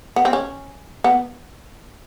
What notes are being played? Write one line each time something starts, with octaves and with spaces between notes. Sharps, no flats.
B3
C4
C#4
B3